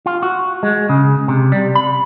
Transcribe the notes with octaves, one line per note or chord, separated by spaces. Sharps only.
F4
F#4
G#3
C#3
C3
G3
B5